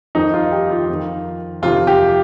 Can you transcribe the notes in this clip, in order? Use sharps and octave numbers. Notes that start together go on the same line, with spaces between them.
F2 D#3 D#4
F4
G4
F4
F2 D#3
F2 C3 D#3 F4
G4